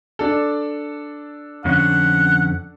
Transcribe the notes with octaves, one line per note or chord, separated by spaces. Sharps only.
D4 A4
F2 D3 C#4 F#5